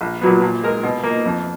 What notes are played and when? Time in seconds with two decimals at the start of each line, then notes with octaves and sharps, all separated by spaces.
0.01 A#1
0.21 A#2 F#3 B3
0.42 A#2
0.63 G#3 D#4 A#4
0.83 B2
1.03 A#3
1.09 D#4
1.25 F2